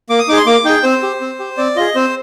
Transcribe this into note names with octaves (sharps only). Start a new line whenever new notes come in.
A#3 D6
D#6
D#4 G#4 D6
C6
A#3 D6
D#4 G#4 G5
C4 C5
G4
C4
G4
C4 D5
F4 G#4 D#5
C4 C5